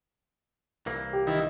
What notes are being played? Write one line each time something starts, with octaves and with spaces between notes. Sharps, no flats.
C2 E3 A#3
G4
D#3 E4 D#5